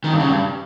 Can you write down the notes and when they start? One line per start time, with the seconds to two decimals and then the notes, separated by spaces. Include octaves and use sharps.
0.04 D#3
0.12 G2
0.20 C#3
0.28 G2